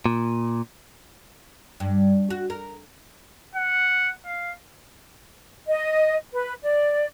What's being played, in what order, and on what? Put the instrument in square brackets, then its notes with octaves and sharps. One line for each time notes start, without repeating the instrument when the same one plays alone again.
[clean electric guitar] A#2
[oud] G2
F#4
A#4
[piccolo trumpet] F#5
F5
[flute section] D#5
B4
D5